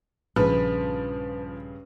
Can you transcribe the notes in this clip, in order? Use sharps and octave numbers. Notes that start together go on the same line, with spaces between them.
A#1 G2 C#3 F3 B4